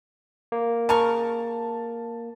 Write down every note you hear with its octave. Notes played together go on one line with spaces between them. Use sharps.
A#3
C#3 A#4 A5 C#6